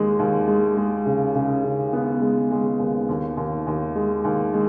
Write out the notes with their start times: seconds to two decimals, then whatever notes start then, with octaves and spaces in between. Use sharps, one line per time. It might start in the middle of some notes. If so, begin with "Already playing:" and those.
Already playing: D#2 G#3
0.19 D#2
0.48 G#3
0.77 G#3
1.06 C#3
1.35 C#3
1.64 C#3
1.93 B3
2.21 G#3
2.51 G#3
2.79 D#2
3.09 D#2
3.37 D#2
3.67 D#2
3.96 G#3
4.24 D#2
4.54 G#3